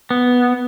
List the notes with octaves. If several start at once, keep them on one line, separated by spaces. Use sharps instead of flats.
B3